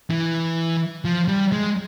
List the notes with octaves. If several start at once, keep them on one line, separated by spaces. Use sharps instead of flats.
E3
F3
G3
G#3